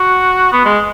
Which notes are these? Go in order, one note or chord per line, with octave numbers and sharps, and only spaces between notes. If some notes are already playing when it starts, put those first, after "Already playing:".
Already playing: F#4
B3
G#3